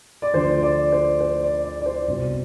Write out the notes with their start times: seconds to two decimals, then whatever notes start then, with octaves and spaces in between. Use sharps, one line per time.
0.22 D5
0.34 D2 D3 F3 C5
0.63 D5
0.92 C5
1.21 C5
1.43 D5
1.64 D5
1.81 D5
1.86 C5
2.08 C2 B2